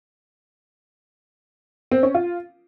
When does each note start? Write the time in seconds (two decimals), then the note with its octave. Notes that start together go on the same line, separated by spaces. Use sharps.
1.91 C4
2.03 C#4
2.15 F4